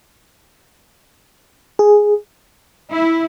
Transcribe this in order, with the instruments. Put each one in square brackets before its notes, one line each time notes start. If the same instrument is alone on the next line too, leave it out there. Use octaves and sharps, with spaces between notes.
[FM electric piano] G#4
[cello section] E4